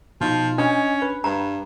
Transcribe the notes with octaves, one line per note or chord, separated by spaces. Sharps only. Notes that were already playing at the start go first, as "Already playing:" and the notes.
B2 F3 D#4
C#4 D4 D#5
B4
G2 A#5